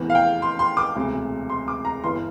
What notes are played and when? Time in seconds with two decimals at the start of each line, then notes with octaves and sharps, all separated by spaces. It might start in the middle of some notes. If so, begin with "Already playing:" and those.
Already playing: F1 E2 E3
0.10 F5
0.15 G5
0.42 C6
0.59 C6
0.77 D6
0.96 E1 D2 C3
1.50 C6
1.68 D6
1.85 A#5
2.04 G1 G2 E3 C6